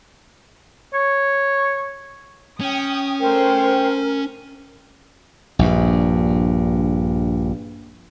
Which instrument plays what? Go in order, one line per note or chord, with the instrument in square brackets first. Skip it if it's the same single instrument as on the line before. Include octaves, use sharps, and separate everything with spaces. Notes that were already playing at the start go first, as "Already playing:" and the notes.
[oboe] C#5
[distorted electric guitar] C#4 [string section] G5 D#6
[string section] A3 C5 [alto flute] A#4 [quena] G5
[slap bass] A#1 G2